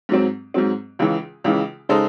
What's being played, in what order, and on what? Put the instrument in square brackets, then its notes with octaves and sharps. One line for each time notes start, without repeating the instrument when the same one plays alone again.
[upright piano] G#2 F#3 C4
G#2 F#3 C4
C#2 C#3 E3
C#2 C#3 E3
C#3 G#3 D#4 A4 C5